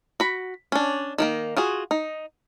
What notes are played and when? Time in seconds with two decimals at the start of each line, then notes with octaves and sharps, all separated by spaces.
0.20 F#4 B5
0.72 C#4 D4
1.18 D#3 G3 A#3
1.57 F4 F#4 G#4
1.91 D#4